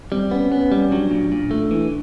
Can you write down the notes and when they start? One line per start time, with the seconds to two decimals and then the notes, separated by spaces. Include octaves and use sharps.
0.12 G3 C4
0.31 B3 C#4
0.52 B3 C#4
0.72 G3
0.92 F#3 D4
1.11 A#2
1.32 A#2
1.51 A3
1.71 E3